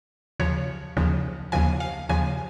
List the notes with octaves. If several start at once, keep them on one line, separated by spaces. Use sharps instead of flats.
D#2 C#3 F3 C#5
D#2 C#3 F3
D#2 C#3 F3 G#5
F5
D#2 C#3 F3 G#5